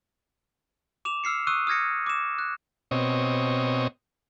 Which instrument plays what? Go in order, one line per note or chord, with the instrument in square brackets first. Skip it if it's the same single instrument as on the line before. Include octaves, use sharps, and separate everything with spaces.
[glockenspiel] D6 E7 F7
E6 F6 C7 C#7
C#6 D#6 E6 F#6 D#7
D#6 F6 G#6 A#6 C#7
D6 E7
F#6
[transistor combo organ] B2 C4 C#5 D#5